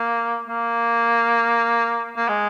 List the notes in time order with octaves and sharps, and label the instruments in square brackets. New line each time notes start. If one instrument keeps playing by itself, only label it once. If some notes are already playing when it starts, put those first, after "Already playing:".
Already playing: [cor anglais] A#3
A#3
A#3
G#3